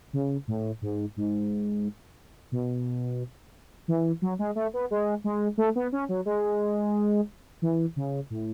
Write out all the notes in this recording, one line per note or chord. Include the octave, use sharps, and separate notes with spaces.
C#3
A2
G#2
G#2
B2
E3
F#3
G#3
A3
B3
G#3
G#3
A3
B3
C#4
F#3
G#3
E3
C#3
A2